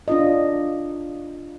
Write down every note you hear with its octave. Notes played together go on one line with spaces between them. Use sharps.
D4 F4 D#5